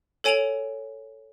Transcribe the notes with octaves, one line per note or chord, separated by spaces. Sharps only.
A4 C#5 G#5 D7 F7 F#7